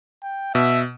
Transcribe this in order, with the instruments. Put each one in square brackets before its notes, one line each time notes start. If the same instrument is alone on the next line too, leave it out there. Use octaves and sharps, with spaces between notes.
[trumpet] G5
[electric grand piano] B2 [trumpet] E5